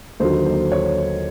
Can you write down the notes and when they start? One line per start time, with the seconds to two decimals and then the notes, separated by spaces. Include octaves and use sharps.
0.20 D#2 D3 F#3 C5
0.46 C5
0.72 C#5